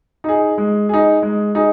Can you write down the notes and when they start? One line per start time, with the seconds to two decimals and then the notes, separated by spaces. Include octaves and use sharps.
0.24 D#4 G#4
0.58 G#3
0.89 D#4 G#4
1.23 G#3
1.55 D#4 G#4